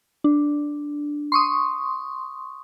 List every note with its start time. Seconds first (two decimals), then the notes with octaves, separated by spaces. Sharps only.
0.24 D4
1.32 C6 C#6 D#6